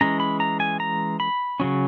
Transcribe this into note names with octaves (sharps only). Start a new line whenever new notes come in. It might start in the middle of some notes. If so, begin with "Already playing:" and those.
E3 G#3 C#4 A#5
B5
A#5
G#5
A#5
B5
C#3 F#3 C#4